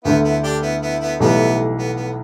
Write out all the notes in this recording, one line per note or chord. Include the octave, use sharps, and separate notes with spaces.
D2 D3 A3 B3 E4
B3 E4
D4 G4
B3 E4
B3 E4
B3 E4
B1 A2 E3 G3 B3 E4
B3
B3